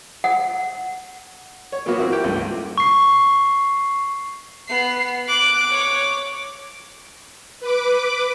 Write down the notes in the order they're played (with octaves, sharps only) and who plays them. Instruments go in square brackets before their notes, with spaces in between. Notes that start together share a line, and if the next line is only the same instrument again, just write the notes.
[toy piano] F#5
[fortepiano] C#5
A#2 F#3 A#3 B3 F#4
A#3 C4 E4 F#4
G4 G5
C#2 G2 A3
[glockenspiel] C#6 C7
[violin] B3 C7
[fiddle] D6 [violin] F#6
[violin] C#5
[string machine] B4 D6